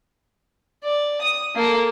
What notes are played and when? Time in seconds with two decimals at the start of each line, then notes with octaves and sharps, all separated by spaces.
0.84 D5
1.21 D#6
1.55 A#3 A4